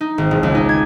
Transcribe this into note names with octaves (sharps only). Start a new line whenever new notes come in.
D#4
G#1
E1
C#2
D#4
G#6